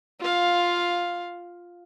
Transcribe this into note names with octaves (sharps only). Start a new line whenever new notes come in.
F4 F5